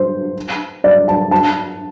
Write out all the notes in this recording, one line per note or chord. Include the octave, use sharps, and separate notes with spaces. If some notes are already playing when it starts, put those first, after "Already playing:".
Already playing: C5
D5
A5
A5